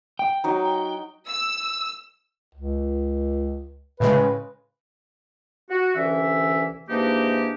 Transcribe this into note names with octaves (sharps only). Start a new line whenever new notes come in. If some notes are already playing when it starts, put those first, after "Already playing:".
G5
F#3 D#4
E6
C#2
A2 C#3 G#3 B4
F#4
C2 D3 E3 C#4 E5
G#2 E3 A#3 D4 D#4 G4